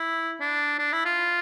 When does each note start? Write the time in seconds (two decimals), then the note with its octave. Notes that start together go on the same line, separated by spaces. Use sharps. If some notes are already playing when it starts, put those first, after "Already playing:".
Already playing: E4
0.40 D4
0.79 D4
0.93 E4
1.05 F4